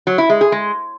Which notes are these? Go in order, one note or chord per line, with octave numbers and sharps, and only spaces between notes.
F#3
E4
G#3
G#4
G#3